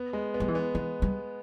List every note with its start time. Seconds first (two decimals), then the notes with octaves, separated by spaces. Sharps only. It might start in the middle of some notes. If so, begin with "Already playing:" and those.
Already playing: B3
0.13 G#3
0.34 B3
0.40 G3
0.48 E3
0.55 B3
0.75 E3 B3
1.02 G3